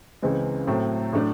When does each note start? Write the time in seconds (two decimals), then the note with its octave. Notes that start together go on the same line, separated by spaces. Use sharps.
0.22 C#2 C#3 E3 G#3 C4
0.67 A2 F#3 A3 C4
1.13 A2 F#3 A3 D4